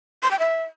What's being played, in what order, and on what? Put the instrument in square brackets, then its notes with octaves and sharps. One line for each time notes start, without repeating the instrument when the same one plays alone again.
[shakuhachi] C6
G5
E5